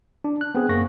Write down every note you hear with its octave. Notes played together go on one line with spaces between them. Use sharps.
D4
F#6
B3 C4 G#4
F#2 A#3 C#6 A#6